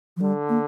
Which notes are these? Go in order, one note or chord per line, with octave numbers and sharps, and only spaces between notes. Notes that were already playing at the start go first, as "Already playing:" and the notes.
F3
D3 G3
A#3